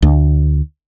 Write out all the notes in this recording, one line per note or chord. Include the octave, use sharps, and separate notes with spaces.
D2